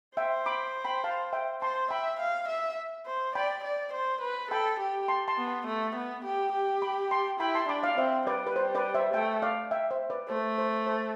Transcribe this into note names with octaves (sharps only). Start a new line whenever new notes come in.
C5 E5 G5
B5 D6
G5 B5
F5 A5
E5 G5
C5 A5 C6
E5 G5 B5
F5
E5
C5
D5 G5 B5
D5
C5
B4
A4 G5 B5
G4
A5 C6
A5 C6
B3
A5 C6
A3
B3
G4
G4
B5 D6
A5 C6
E4 G5 B5
A5 C6
D4 B5 D6
D5 F5
C4 C5 E5
G3 B4 D5
B4
G3 C5
B4 D5
C5 E5
A3 E5 G5
D5 F5
E5 G5
C5 E5
B4 D5
A3 C5
C5
C5